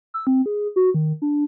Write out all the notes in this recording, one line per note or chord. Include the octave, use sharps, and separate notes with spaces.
E6
C4
G#4
F#4
D#3
D4